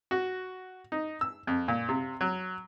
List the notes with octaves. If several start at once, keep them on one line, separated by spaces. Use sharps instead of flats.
F#4
D#4
E6
F2
A#2
C3
F#3